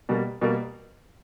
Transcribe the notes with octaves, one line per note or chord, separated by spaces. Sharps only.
B2 G3 A#3
B2 G3 A#3